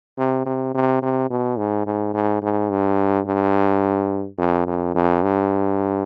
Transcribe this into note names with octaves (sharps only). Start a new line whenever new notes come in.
C3
C3
C3
C3
B2
G#2
G#2
G#2
G#2
G2
G2
F2
F2
F2
G2